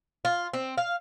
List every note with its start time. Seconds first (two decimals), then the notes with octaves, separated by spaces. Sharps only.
0.25 F4
0.53 C4
0.77 F5